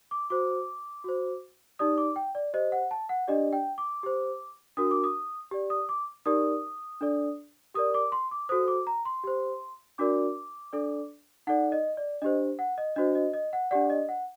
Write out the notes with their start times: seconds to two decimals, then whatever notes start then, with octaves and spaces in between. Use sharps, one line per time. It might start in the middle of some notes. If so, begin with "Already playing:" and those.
0.11 D6
0.30 F#4 C5 D6
1.04 F#4 C5
1.79 D#4 G4 D5 D#6
1.98 D6
2.16 G5
2.35 D5
2.53 G4 C5 D#5
2.72 F#5
2.91 A5
3.09 F#5
3.28 D4 G4 D5 D#5
3.53 G5
3.78 D6
4.03 G4 C5
4.77 D4 F#4 A#4 D#6
4.91 D6
5.04 D#6
5.51 G4 D5
5.70 D#6
5.89 D6
6.26 D#4 G4 A#4 D5 D#6
7.01 D4 A4 D5
7.75 G4 A#4 D5 D#6
7.94 D6
8.12 C6
8.31 D6
8.49 F#4 A4 C5 D#6
8.68 D6
8.87 A#5
9.05 C6
9.24 G4 C5
9.98 D4 F#4 A#4 D5 D6
10.73 D4 A4 D5
11.47 D#4 A4 D5 F#5
11.72 D#5
11.97 D5
12.22 D4 G4 C5 D#5
12.59 F#5
12.78 D#5
12.96 D4 F#4 C5 D#5
13.15 D#5
13.34 D#5
13.53 F#5
13.71 D4 G4 D5 F#5
13.90 D#5
14.09 F#5